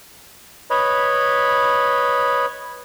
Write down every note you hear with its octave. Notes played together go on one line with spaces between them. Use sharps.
B4 C#5 D#5 B5